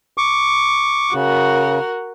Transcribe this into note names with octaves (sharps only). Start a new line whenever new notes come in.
C#6 D6
C#3 F#4 A#4